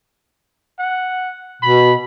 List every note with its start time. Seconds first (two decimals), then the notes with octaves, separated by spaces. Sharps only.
0.79 F#5
1.62 B2 B5